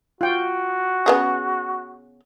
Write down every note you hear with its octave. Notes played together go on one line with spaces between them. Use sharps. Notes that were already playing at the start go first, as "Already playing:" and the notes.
F4 F#4 G5
C#3 B3 G#4